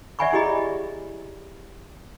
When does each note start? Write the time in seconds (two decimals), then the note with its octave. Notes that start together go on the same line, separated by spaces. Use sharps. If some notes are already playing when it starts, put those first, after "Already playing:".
0.19 D5 E5 F#5 G#5 B5 C#6
0.33 E4 G4 G#4 D#5 B5